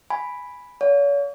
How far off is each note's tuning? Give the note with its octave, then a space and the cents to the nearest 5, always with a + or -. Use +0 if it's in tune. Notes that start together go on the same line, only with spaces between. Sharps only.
G#5 +0 B5 +0
C#5 +40 F5 +30